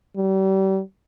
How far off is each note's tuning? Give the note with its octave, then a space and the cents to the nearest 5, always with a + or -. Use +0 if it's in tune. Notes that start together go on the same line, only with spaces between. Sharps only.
G3 -35